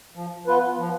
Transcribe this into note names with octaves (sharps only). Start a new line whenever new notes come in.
F3
B3 F4 B4
F3